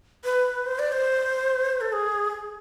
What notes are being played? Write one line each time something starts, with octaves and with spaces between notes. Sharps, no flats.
B4
C5
D5
C5
A4
G#4